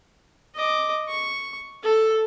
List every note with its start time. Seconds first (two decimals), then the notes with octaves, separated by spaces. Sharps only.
0.55 D#5 D6
1.08 C#6
1.84 A4